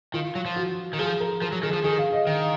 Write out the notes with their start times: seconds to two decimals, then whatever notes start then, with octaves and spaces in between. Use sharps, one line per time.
0.14 D#3 F4
0.35 F#3
0.45 F3
0.56 F#4
0.93 D#3
0.99 F3 G#4
1.20 A#4
1.41 F3 A#4
1.52 F#3
1.63 D#3 G#4
1.73 F3
1.84 D#3 G#4
1.98 F5
2.13 D#5
2.27 D#3 F5